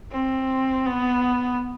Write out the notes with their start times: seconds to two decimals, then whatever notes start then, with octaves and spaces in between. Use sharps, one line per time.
0.12 C4
0.87 B3